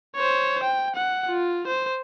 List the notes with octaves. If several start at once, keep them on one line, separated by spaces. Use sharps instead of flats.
C5 C#5
G5
F#5
F4
C5